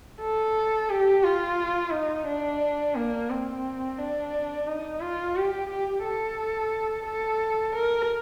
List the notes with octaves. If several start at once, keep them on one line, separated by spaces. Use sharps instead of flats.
A4
G4
F4
D#4
D4
A#3
C4
D4
D#4
F4
G4
G4
A4
A4
A#4